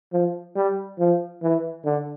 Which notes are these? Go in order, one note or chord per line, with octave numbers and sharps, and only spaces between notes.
F3
G3
F3
E3
D3